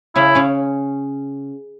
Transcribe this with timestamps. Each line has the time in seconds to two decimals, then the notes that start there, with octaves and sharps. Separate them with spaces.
0.16 C#3 C#4 E4
0.35 C#3 C#4